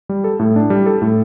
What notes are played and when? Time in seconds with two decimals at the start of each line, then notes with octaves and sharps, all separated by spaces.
0.09 G3
0.24 A4
0.39 A2
0.56 D4
0.70 G3
0.86 A4
1.02 A2